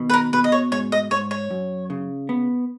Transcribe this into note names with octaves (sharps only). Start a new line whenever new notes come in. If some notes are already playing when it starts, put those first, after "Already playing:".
Already playing: B2 D#3
B4
A#4
B2 B4
D#5
C#5
G#2 C#5
D#5
G#2 C#5
C#5
F#2
C#3
B3